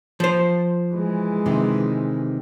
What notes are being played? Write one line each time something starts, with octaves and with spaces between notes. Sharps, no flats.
F3 C5
E3 G#3
C3 D#3